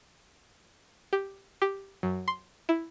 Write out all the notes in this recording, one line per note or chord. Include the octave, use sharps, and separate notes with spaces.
G4
G4
F#2
C6
E4